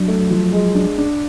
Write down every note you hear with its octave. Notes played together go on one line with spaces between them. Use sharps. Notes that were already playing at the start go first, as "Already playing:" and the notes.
Already playing: F#3 D4
A3
F3
G#3
D4
D4